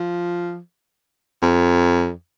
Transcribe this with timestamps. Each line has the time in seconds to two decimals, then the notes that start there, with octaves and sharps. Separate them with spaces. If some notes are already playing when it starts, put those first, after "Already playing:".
Already playing: F3
1.42 F2